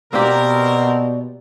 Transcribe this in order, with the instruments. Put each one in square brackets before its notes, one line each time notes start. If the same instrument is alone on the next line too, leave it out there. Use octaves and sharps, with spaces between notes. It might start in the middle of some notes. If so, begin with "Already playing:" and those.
[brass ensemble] B2 [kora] A#3 G4 [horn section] C4 A#4 [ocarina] D5